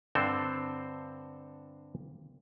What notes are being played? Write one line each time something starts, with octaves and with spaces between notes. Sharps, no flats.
G2 D3 C4 A4 C5